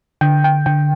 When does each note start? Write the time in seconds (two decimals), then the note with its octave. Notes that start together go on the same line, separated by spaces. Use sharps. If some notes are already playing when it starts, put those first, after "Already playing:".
0.21 D3 G5
0.44 G5
0.66 D3 G5